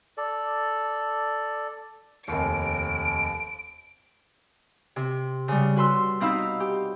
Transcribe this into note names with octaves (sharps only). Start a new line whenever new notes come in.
A4 D5
F1 D#2 D7
C3
C#3 G3
F#4 B4 C6 E6
B2 C4 D#4 F5 B5 E6
G4